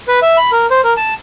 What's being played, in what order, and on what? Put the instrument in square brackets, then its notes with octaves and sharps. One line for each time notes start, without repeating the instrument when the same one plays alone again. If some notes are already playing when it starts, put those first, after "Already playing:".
[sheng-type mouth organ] B4
E5
B5
A#4
C5
A#4
A5